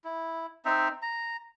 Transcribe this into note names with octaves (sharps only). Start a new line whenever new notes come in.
E4
C4 D#4 C5 E5
A#5